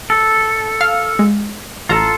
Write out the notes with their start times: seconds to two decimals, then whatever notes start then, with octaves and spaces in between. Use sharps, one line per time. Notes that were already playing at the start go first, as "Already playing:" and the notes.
0.10 A4
0.81 F5 F6
1.19 G#3
1.89 A1 F4 A4 A#5